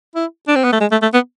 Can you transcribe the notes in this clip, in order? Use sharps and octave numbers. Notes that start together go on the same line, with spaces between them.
E4
D4
C4
B3
A3
G#3
A3
A3
B3